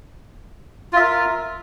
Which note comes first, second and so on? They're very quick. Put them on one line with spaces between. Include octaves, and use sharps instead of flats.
F4 E5 A#4